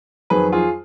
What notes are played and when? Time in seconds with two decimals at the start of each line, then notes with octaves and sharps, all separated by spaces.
0.30 F2 D#3 F#3 G#4 B4
0.52 F4 G#4